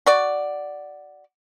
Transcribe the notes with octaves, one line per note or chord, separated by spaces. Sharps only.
F#4 D5